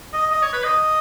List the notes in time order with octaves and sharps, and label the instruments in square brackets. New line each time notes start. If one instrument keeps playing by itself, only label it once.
[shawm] D#5
D#5
C#5
B4
D#5